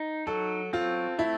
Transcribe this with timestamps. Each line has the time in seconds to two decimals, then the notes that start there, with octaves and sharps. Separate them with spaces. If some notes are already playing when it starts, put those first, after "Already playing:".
Already playing: D#4
0.27 F#3 A4
0.73 C4 F4
1.18 A3 E4